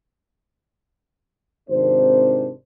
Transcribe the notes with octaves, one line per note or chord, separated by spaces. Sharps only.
G#1 C3 D#3 D4 C5